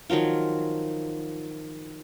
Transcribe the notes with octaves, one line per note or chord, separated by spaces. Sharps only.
D#3 F3 F#3 F4